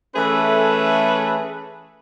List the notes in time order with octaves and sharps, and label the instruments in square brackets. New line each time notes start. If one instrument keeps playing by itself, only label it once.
[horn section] E3 A3 C#4 G#4 A4 B4